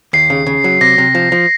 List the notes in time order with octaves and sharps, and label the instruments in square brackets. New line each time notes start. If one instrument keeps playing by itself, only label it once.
[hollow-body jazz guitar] D#2 [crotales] C7
[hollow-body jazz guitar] C#3
C#3
F#3
[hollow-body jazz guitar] C3 [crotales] A#6
[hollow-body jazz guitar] C3
F3
F3